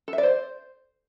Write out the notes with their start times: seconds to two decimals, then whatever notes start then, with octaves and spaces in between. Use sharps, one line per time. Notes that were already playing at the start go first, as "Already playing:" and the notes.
0.08 A4
0.13 E5
0.18 D5
0.23 C5